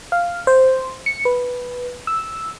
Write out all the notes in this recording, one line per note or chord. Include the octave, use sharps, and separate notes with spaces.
F5
C5
C#7
B4
E6